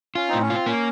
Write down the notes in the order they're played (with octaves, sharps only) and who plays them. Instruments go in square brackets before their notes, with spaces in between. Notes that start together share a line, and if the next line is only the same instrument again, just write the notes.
[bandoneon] C#4 [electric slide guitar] F4
[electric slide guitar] A2 [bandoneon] C4 D#4
[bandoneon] C#4
[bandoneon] C4 [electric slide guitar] F4
[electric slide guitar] A#3 [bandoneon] C#4